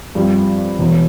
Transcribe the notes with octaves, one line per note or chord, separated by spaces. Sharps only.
G2 F3 C4 G4
E1 E2 E3